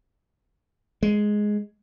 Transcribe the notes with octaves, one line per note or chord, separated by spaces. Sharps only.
G#3